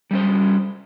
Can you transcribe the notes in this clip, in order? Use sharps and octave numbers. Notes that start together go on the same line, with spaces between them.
G3 C#4 C5